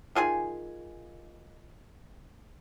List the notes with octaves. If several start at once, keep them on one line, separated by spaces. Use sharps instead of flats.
D#3 F4 G#4 G#5